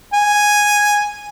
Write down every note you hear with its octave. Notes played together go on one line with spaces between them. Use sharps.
G#5